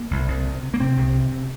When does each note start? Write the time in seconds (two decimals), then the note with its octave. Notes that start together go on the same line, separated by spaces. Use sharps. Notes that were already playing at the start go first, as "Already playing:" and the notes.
Already playing: A#3
0.11 C2
0.28 C2
0.46 C3
0.63 C3
0.74 A#3
0.80 C3 C4
0.97 C2
1.15 C3
1.32 C3